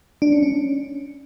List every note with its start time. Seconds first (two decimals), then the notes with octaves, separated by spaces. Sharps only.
0.22 D4
0.32 C#4
0.43 C#4